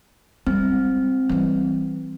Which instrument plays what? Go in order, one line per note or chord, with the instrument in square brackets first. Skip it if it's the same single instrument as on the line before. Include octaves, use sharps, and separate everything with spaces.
[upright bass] G3 G#3 [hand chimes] C4
[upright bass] E3 G3